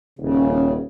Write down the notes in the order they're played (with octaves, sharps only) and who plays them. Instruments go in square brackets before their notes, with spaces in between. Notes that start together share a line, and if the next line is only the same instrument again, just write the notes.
[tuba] D#1 [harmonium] C#3